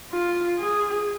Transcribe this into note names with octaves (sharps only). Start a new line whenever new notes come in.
F4
G#4